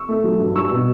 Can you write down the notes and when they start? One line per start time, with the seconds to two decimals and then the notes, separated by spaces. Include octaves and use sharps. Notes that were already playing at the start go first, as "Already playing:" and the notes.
Already playing: C#6 E6
0.09 A3
0.24 F#3
0.40 G2
0.55 G3 C#6 E6
0.71 B2